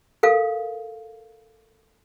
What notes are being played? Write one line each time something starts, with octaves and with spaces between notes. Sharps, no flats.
A4 A#4 F5